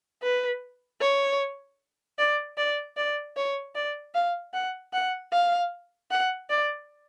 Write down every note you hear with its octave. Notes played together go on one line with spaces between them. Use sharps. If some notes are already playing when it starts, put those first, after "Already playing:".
B4
C#5
D5
D5
D5
C#5
D5
F5
F#5
F#5
F5
F#5
D5